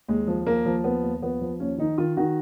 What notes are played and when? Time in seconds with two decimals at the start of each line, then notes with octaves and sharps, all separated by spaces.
0.08 D#2 G#3
0.27 F3
0.46 D#2 A#3
0.66 F3
0.84 D#2 B3
1.03 D#2
1.22 F3 B3
1.41 F3
1.60 D#2 C#4
1.78 D#3 D#4
1.98 D#3 F4
2.17 D#3 F#4